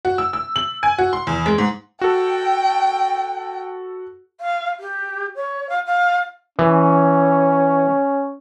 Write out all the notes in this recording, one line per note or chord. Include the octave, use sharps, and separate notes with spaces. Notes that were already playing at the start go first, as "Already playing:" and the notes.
F#4
E6
E6
F#7
G#5
F#4
C6
E2
G#3
G#2
F#4 A4 G5
F5
G4
C#5
F5
F5
E3 C#4